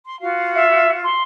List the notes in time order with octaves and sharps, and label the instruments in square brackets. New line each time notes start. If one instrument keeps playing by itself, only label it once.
[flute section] C6
F4 F#4 F5
[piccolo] E5
C6